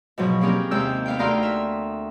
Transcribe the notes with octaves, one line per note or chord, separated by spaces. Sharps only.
G#2 B2 F3 F#3
A#3 C4 C#4 G4 G#4 A#4
D#2 C3 G#3 A#4 E6 G6
B3 F5 G5
D2 D#4 A#4 F5 C6 E6
E5